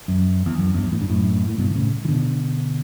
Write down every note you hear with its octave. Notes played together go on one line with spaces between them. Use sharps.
F#2
E2
F#2
E2 G2
A2
G2
F#2 A2
A2
G2 B2
D3
A2 C#3
E3
B2 D3